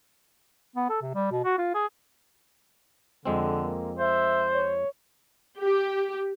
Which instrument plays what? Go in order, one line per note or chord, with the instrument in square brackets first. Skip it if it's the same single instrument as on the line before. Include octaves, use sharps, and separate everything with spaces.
[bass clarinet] B3
A4
C3
G3
B2
F#4
F4
G#4
[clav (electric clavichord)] F2 G#3 C4 [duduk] D3
[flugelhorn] A#3
[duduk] C5 [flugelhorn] E5
[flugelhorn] C#5
[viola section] G4